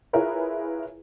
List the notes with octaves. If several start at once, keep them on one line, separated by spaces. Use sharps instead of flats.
E4 F4 G#4 A#4 B4 C#5